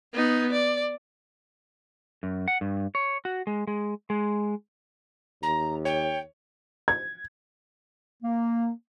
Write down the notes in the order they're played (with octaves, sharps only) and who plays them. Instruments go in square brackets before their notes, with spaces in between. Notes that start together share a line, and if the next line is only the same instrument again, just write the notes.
[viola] B3 D#4
D5
[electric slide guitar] F#2
F#5
G2
C#5
F#4
G#3
G#3
G#3
[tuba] D#2 [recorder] A#5
[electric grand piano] C#5 [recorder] G5
[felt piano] G#6
[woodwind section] A#3